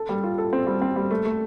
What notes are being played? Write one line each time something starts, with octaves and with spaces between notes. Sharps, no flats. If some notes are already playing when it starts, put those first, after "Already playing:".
Already playing: A4
G3
F4
A4
C4
G3
C4
G3
A3
A3